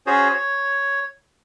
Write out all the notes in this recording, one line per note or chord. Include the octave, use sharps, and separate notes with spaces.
C#4 F#4 G#4 C5 C#5
C#5